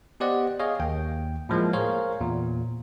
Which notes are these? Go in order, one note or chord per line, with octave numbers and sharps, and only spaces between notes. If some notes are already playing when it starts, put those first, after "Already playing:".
B3 G4 C5 D5 D#5 F#5
G#4 C#5 D#5 F5
D#2 G5
A2 F3 G#3 A#3
G#4 A#4 C5 C#5 F5
E2 A#2